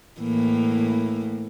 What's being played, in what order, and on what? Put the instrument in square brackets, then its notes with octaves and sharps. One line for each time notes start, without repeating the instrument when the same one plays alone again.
[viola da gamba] A2 E3 A#3